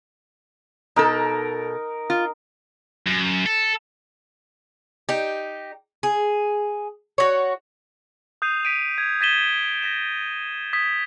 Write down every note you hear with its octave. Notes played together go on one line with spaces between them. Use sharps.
B2 D#4 A4 A#4
F4
F#2
A4
D#4 G4
G#4
F#4 C#5
D#6 G6 C7 D#7 F7
B6 D7 D#7
G#6
G#6 A6 B6 D#7 E7 G7
A#6 B6 E7
D#6 G#6 B6